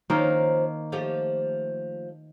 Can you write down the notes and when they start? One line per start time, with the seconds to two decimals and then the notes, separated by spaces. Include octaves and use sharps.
0.10 D#3 F3 A#3 C#4
0.92 F3 A3 G4